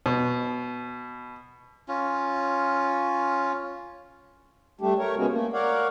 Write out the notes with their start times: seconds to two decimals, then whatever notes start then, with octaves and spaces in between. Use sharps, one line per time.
0.06 B2
1.88 C#4 F4
4.81 G3 A3 D4 G4
4.98 A3 A#4 C#5
5.16 C#3 G#3 A#3 B3 C#4 F#4
5.29 A3 A#3
5.53 A#4 C#5 D5 F5 F#5